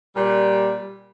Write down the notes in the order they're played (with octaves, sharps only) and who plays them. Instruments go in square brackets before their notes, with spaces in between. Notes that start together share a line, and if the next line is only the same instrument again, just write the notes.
[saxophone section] A#2 G3